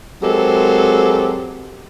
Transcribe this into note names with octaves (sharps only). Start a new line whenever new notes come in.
F#3 G#3 C4 G4 A4 A#4